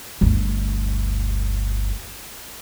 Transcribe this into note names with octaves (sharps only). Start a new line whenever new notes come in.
G1 D2